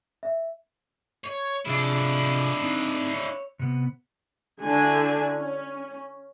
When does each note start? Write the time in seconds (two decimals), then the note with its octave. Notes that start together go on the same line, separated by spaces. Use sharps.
0.23 E5
1.24 C#5
1.66 C3 F3 D4 E4 G#4
2.61 C4 D#4
3.14 C#5
3.59 C3 B3
4.63 D3 D4 E4 F#4 G#5
5.34 C#4